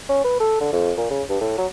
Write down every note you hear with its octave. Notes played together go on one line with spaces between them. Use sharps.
C#4
B4
A4
D3
F2
A#2
C#3
G2
A2
F#3